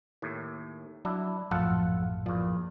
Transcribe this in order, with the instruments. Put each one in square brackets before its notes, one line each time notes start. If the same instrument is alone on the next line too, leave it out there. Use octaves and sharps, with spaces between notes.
[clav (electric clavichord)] D#2 A2
[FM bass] F#3 [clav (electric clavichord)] D4 E4
[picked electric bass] A#1 F#2 A2 [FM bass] F3 [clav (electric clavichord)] F4 A4 F#5
[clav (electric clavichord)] E2 A#2 [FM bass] F3